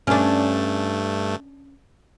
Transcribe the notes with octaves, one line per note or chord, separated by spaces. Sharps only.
G2 A3 C#4 D4